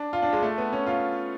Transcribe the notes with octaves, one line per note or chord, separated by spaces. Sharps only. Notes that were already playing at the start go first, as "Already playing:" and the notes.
Already playing: D4
F4
D4
G#3
A3
B3
C#4
F4